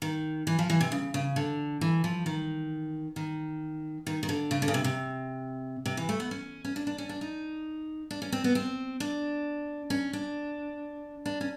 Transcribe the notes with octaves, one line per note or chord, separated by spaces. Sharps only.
D#3
E3
F3
E3
C3
C#3
C#3
D3
E3
F3
D#3
D#3
D#3
D#3
D3
C#3
D3
C#3
C3
C3
C3
E3
A3
B3
C#4
C#4
D4
D4
C#4
D4
D#4
D4
C#4
C4
B3
C4
D4
C#4
D4
D4
C#4